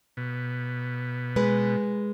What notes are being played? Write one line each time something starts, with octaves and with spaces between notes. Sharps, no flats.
B2
G#3 B4